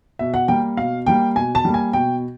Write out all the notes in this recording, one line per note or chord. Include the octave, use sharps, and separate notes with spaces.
B2 E5
F#5
G3 A#3 G5
B2 F5
G3 A#3 G5
B2 G#5
A5
G3 A#3
G#5
B2 G5